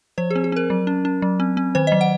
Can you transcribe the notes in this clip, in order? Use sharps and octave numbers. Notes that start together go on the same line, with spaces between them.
F3 C5
G#4
C4
G#4
C4 A#4
F#3
C#4
C#4
F#3
C4
C4
D#3 C5
F#3 D#5
F#5